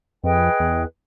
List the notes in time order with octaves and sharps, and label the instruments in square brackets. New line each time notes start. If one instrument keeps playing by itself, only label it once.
[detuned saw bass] F2 [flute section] G#4 B4 D#5 G5
[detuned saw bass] E2